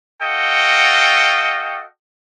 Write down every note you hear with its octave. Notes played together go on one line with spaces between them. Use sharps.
F#4 A4 D#5 F5 G5